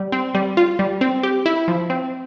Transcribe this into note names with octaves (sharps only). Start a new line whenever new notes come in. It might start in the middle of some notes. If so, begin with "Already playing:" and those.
Already playing: G3
C4
G3
F4
G3
C4
G4
E4
F3
C4